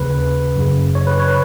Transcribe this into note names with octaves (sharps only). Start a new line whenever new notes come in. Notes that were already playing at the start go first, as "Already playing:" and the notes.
Already playing: D#2 C#3 B4
F#2 C#3
C#5
B4
C#5
B4